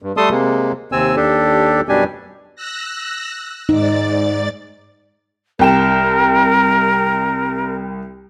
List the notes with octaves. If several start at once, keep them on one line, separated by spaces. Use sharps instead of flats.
G2
G3 A3 A4 A5 C6 D#6
C3 G#3 A#3
D#2 C3 C4 G#5 E6
D#2 D4 G4 A4
F#2 B2 G3 D4 G4 G#5
E6 F#6 A#6
G#2 D#4 D5 A6
C2 A#4 G5 E7